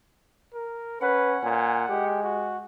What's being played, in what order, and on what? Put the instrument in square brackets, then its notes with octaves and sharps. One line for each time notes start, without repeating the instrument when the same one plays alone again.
[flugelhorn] A#4
[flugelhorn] C#4 [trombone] B4 [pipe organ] F#5
[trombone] A#2 [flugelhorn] G#5
[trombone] G#3 [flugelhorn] G4
[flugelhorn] F#4